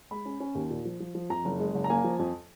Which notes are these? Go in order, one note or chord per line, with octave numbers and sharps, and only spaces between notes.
G#3 B5
C#4
C#4
D#2
A#2
F3
F3
F3
F2 A#5
F#1
G#3
F#1
A#5
A#3 G#5
F3
F2